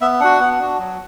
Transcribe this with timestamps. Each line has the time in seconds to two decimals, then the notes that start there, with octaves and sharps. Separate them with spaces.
0.01 B3 E5
0.20 D4 F#4 F#5
0.40 B3
0.59 D4 F#4
0.78 F#3